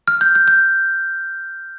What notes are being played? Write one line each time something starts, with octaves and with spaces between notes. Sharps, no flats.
F6
G6
G6
G6